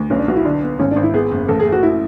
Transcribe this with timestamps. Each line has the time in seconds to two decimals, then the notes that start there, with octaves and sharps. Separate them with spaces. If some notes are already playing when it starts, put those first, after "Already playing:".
Already playing: D2
0.10 B1 C#4
0.19 D4
0.28 B1 F#4
0.36 E4
0.45 D3 D4
0.63 B3
0.79 G#1 C#4
0.91 G#1 D4
1.03 E4
1.14 B3 G#4
1.31 F#1
1.48 A1 A4
1.60 G#4
1.66 A3
1.72 F#4
1.83 E4